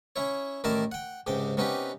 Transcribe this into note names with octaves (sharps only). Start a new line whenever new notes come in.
C#4 E4 C#5
A1 D#3 E4 A#4 D5 A5
F#5 G5
C#2 G#2 C3 G5
C3 B3 C#4 D#4 G4 B4